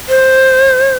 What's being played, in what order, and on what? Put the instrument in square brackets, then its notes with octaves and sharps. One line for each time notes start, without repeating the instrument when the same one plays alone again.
[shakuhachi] C5